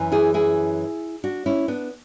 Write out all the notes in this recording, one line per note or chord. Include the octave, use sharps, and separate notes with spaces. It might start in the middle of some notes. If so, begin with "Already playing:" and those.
Already playing: F#2 E3
E4 G#4
E4 G#4
D4 F#4
C#4 E4
B3 D4